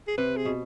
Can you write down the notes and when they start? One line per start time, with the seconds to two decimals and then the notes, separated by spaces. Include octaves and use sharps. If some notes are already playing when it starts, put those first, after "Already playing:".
0.07 G#4
0.18 C3 B4
0.37 G#4
0.45 B2